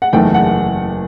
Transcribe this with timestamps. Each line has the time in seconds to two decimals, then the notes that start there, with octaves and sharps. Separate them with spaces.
0.02 F#5
0.13 F#1 E2 D#3 A3 G5
0.34 F#5